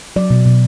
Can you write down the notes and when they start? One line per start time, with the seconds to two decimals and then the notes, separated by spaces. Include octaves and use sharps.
0.16 F#3 D5
0.30 B2
0.46 B2